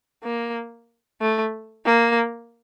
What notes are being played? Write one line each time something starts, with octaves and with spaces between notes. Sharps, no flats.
A#3
A3
A#3